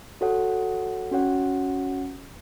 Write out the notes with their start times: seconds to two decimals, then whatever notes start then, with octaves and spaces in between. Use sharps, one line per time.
0.21 F#4 A4 C#5 F#5
1.11 C#4 F#4 C#5 F#5